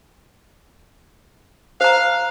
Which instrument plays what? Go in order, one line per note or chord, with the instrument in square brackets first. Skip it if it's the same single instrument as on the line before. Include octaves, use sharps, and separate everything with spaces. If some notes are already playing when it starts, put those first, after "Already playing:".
[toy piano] C5 A#5 [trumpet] F5